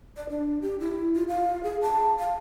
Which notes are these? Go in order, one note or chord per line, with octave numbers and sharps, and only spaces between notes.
D5
D4
G4
E4
F4
F5
G#4
A5
F5